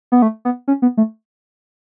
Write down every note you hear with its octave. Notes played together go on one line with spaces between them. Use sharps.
B3
A3
B3
C#4
B3
A3